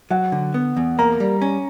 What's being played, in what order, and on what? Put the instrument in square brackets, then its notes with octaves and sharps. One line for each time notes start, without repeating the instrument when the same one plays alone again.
[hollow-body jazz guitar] F#3 [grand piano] F#5
[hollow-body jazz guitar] D3
B3
E2
[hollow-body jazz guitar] A#3 [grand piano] A#5
[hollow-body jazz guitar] G3
C#4